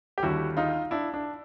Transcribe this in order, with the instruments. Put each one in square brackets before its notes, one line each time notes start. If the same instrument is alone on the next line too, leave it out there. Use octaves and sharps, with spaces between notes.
[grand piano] G4
D#2 D3 G3 E4 F#4
D#4 F4
D4 E4
D4